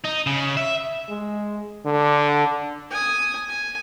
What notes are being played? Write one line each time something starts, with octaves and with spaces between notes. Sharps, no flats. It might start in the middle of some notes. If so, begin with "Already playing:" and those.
D#4
C#3
E5
G#3
D3
G#5 D#6
G#5